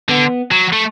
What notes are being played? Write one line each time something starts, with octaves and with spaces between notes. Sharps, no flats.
D3 B3
F#3
A3